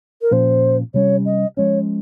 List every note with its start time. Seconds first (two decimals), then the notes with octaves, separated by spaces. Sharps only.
0.21 A#4
0.31 A#2 F3 A#3 C#4 C5
0.94 C3 G3 C#4 C#5
1.25 D#5
1.57 F3 G#3 C#4 C#5